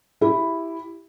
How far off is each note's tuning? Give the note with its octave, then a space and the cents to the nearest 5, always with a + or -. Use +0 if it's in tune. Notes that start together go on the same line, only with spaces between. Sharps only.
E4 +0 G4 +0